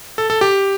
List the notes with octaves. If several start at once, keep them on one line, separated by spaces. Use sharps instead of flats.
A4
A4
G4